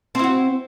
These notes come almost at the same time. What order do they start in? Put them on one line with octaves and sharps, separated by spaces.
C4 E4 F#4